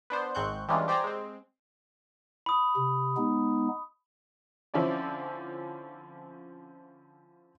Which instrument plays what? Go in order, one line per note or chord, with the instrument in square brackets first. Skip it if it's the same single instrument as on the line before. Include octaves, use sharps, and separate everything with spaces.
[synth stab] B3 D4 C5
G#1 G#2 C4 C#6 F#6 G6
E3 G3 G#3 C#4 D4 F4
G4 C5 D5 G5 G#5 A#5
G#3 C4
[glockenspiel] B5 D#6
[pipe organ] C3
G#3 B3 D#4
[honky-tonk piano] D3 F3 C4 C#4 E4 D5